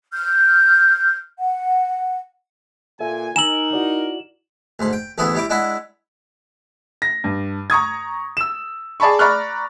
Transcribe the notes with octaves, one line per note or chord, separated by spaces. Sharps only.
F6 G6
F#5
A#2 A4 E5 G#5
D#4 A#4 G#5 A#5 E6 E7 F#7
E4 F#4 D5
D2 G#2 C6
G5
A1 D2 A3 B3 E4 G#4
G3 E4 D6
G#3 D4 E4 E5 F#5
A#6
G2
A#5 C#6 D#6 G#6
E6 E7
G#4 D5 A5 B5 C#6
D5 A#5 B5 C#6 F6 F#6